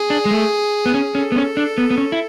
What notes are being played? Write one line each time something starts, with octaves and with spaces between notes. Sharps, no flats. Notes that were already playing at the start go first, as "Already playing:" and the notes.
Already playing: G#4
D4
G#3
A3
B3
C#4
C#4 A4
B3
C#4
D4
B3
B3
C#4
E4